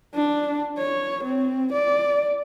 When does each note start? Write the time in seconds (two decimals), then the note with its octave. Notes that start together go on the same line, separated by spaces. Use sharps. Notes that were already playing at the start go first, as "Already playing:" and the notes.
0.15 D4
0.78 C#5
1.24 C4
1.73 D5